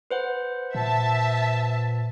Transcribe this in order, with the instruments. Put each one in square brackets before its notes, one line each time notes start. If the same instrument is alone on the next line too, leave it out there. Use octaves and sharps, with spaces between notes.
[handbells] B4 C5 F#5
[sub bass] A#2 [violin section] E5 A5